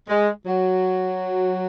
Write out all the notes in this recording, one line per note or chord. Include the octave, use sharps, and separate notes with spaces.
G#3
F#3